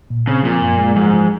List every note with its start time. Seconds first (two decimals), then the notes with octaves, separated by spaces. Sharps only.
0.10 A#2
0.27 C#3 C4
0.44 A#2 F3
0.62 F#2
0.79 G#3
0.96 G#2 F3
1.13 F3